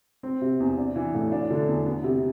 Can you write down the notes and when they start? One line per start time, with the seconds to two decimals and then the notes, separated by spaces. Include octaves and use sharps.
0.23 C4
0.41 C3
0.60 E2
0.78 D4
0.96 E3
1.14 A2
1.32 D4
1.50 D3
1.68 E2
1.86 B3
2.04 C3